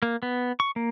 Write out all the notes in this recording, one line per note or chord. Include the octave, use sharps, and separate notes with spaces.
A#3
B3
C#6
A#3